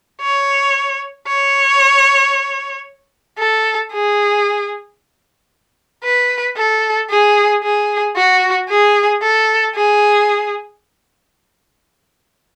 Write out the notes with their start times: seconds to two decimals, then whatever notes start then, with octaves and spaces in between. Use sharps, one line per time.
0.21 C#5
1.27 C#5
3.39 A4
3.92 G#4
6.05 B4
6.57 A4
7.10 G#4
7.63 G#4
8.16 F#4
8.69 G#4
9.22 A4
9.75 G#4